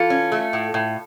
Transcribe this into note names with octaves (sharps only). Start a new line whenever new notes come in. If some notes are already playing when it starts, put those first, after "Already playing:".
Already playing: E3 F4 A4
C#4
A3
A2
A2